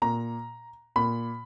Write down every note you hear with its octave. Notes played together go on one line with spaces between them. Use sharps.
A#2 A#5
A#2 B5